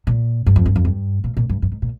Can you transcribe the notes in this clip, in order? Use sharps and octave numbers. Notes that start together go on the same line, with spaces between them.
A#2
G2
F2
G2
F2
G2
A#2
A#2
G2
G2
G#2
A#2